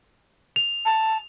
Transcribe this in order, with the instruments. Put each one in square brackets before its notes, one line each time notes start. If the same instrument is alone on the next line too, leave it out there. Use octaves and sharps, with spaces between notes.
[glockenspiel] F7
[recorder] A5